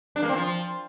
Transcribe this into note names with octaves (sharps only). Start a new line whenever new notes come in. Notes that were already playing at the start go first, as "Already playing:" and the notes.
D4
A#3
C4
F3